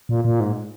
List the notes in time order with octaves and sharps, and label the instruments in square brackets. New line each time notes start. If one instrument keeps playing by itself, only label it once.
[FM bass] A#2
A#2
G#2